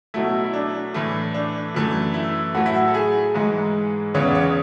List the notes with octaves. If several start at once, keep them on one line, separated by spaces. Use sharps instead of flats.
B2 F#3 A3 E4
E4
D4
A2 E3 A3
D4
F#2 E3 A3
E4
A2 F#3 A3 F#4
E4
F#4
A4
G#4
G#2 E3 G#3
E2 C#3 E3 B3 C#5
D5
C#5